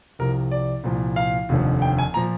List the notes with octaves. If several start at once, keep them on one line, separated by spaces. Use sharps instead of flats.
C2 C3 F3 A#4
D5
C2 A#2 F3
F5
F1 D#2 D3 F3
G5
G#5
A#2 F3 A#5